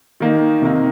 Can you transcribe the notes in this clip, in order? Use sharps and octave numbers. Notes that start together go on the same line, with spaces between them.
D#3 A#3 D#4
C3 D#3 A#3 D#4